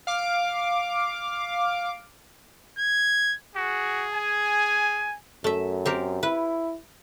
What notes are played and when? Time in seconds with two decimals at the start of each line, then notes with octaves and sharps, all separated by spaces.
0.07 F5 D6
2.79 G#6
3.56 F#4 G#4
4.13 G#5
5.44 F#2 A3 E5
5.86 C4 G4 A#4
6.23 E4 B4